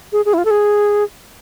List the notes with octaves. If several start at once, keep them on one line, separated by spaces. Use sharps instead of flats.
G#4
G#4
E4
F4
A4
G#4